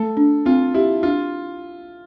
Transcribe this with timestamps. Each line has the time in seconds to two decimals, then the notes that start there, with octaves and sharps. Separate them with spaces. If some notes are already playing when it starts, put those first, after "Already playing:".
Already playing: A3 A4
0.17 D4
0.46 C4 F4
0.74 E4 G4
1.03 D4 F4